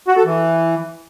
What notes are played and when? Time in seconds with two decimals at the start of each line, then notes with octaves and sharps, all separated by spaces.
0.08 F#4
0.16 A4
0.25 E3